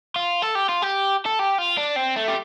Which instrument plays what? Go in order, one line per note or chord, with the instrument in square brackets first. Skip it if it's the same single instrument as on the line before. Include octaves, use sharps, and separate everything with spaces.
[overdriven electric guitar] F4
A4
G4
F4
G4
A4
G4
F4
D4
C4
A3
G4